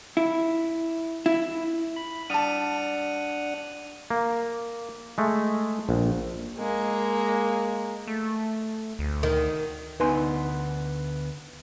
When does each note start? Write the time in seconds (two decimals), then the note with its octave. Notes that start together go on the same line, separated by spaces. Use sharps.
0.17 E4
1.26 E4
1.96 B5
2.30 G3 D4 F#5 A5 D#6 D#7
4.10 A#3
5.18 G#3 A3
5.89 A#1
6.59 G#3 A#3
8.07 A3
8.99 D2
9.23 D#3
10.00 D2 B3 D#4 B4 G#5 C6